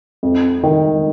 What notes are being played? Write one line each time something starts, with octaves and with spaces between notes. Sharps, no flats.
F2
D#3